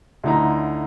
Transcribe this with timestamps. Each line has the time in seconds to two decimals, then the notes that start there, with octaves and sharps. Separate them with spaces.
0.24 D2 D3 D#4 E4 A#5